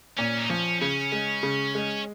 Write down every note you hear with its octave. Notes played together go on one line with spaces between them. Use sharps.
A#2 C#4
D#4
F3 C#4
C#3 C#4
G#3
C#3
G#3